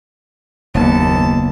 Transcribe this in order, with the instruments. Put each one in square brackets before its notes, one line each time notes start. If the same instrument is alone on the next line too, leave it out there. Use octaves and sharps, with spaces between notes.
[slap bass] F#1 A#3 B3 [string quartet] D#2 A5